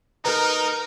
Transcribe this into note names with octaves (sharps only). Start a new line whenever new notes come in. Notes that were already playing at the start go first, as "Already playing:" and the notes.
D#4 A#4 B4 A#5